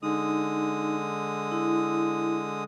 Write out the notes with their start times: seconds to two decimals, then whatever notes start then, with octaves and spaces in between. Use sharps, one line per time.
0.03 D3 G#3 D#4 D#6
1.52 E4